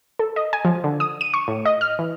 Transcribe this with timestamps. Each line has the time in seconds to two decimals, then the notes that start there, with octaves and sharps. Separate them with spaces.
0.19 A4
0.36 D#5
0.53 G#5
0.65 F3
0.84 D3
1.00 D#6
1.21 D#7
1.34 C#6
1.48 A2
1.65 D#5
1.81 F6
1.99 E3